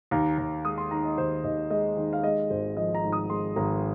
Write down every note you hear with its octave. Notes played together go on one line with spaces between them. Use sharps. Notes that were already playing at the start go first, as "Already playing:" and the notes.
D#2 A#5
D#2 A#5
G#3 D#6
C6
D#3 A#5
D#5
D#2 C5
D#2 D#5
G#3 D#5
D#3
F5
G#3 D#5
G#1 C5
F3 D#5
A#5
G#2
D#6
G#3 C6
G#1 A#5